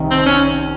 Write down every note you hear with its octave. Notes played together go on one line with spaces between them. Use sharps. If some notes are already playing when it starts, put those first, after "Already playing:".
Already playing: C2 C3 D#3
C4
C#4